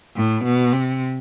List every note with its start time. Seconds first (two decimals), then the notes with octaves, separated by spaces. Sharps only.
0.16 A2
0.44 B2
0.73 C3